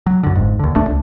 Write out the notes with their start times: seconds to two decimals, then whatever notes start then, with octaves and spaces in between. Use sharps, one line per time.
0.07 F#3
0.23 F#2 D3
0.36 G1 F2 G#2
0.59 D#2 D3
0.75 D#1 A1 A3 D4
0.87 C#2